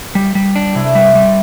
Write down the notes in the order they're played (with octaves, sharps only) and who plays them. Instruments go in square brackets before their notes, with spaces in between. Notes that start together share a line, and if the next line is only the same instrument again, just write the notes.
[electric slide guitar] G3 [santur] G4
[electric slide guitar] G3
D4
[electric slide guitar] C3 [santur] E4
[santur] A3
[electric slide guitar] G3 [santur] B3
[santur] C4
[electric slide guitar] G3